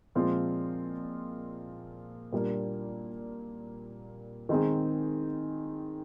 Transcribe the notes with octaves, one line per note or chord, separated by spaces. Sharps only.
A#2 F3 G#3 C4 F4
A#2 G3 A#3 D4
D#3 G#3 C4 D#4 G#4